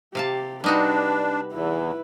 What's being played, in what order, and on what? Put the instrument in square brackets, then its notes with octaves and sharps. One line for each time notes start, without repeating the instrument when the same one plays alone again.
[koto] C3 F5 A5 [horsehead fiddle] G4
[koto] G3 D#4 F#4 [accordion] D4 [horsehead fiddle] B4
[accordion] E2 [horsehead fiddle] E4 B4